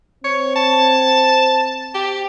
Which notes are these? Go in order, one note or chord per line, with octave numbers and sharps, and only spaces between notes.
C4 C#5
A5
G4